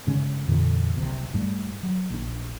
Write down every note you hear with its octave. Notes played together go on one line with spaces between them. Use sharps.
G2 C#3 G#3 C#4
F2 A#2 D3 E3
F#1 C2 C3
G2 G3 A3
F#3
A#1 D4